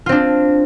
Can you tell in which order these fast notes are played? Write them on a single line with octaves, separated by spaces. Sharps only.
F4 C4 D4